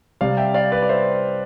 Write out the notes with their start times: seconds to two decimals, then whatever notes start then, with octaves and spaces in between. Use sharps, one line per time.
0.21 C3 G3 D5 F5
0.37 E5 G5
0.54 D5 F5
0.72 B4 D5
0.82 D5
0.89 C5 E5